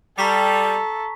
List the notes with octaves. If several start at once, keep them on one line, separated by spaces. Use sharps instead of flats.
G3 A4 A#5 C#6 B6